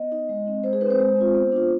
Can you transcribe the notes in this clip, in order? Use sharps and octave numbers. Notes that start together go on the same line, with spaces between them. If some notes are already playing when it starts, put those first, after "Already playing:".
Already playing: B3 D#5
D#4
G#3
C4 D#4
G#3 C5
G#4
D#4 B4
C4 C5
G#3
C4 F4
B3
D4 F4